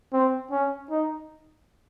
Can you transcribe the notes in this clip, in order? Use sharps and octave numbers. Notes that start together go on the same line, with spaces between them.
C4
C#4
D#4